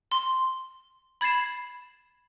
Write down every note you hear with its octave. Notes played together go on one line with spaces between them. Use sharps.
C6
B5 G#6 A6 C7 E7